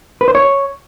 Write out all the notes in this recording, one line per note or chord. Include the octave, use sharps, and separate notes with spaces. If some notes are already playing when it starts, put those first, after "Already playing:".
B4
C5
C#5